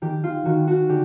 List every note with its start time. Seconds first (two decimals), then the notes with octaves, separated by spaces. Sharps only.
0.02 D#3 G4
0.24 F4
0.45 D#3 F#4
0.67 F#4
0.89 D3 G4